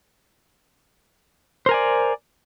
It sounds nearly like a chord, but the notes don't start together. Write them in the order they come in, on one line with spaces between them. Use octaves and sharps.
C5 A#4 G#5 D5